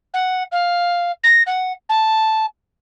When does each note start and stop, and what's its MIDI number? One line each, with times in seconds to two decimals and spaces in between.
0.14 0.43 78
0.52 1.12 77
1.23 1.43 94
1.47 1.73 78
1.89 2.46 81